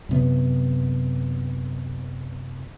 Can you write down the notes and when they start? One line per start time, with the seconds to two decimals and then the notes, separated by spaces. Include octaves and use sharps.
0.09 F#2 C3 B3